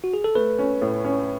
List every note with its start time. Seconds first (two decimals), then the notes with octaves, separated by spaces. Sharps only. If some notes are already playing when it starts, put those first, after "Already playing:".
0.04 F#4
0.14 G#4
0.24 A4
0.35 A3 B4
0.59 C#4
0.82 A2
1.04 C#4